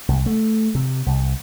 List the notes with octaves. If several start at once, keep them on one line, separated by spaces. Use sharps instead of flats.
C2
A3
C3
C2